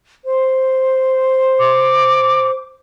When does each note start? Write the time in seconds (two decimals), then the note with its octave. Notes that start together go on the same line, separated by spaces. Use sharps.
0.25 C5
1.59 D6